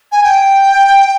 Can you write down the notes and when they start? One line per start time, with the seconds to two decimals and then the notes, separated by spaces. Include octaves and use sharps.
0.12 G#5
0.23 G5